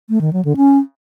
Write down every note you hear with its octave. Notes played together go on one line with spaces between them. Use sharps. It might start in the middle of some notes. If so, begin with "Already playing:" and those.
A3
D#3
F#3
D3
C#4